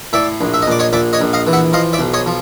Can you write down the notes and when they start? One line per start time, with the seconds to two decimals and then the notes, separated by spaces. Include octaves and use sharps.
0.13 A2 D5 E5
0.41 A#1
0.54 E5
0.62 D#5
0.67 A#1 D5
0.79 C#5 D#5
0.93 A#1 D5 E5
1.13 C#5 D#5
1.21 A#1
1.33 D#5 F5
1.47 E3
1.53 E5 F#5
1.73 F3 D#5 F5
1.93 D5 E5
1.99 B1
2.13 C#5 D#5
2.26 F3